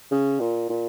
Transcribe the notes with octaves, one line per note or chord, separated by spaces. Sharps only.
C#3
A#2
A#2